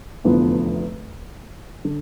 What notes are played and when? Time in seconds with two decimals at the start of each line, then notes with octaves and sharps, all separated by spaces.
0.24 F1 E2 D3 F3 B3
1.85 D3